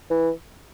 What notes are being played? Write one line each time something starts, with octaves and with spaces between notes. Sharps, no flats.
E3